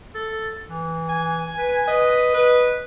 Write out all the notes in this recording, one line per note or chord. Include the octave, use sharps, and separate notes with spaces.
A4
E3
G#5
B4
B4 D#5
B4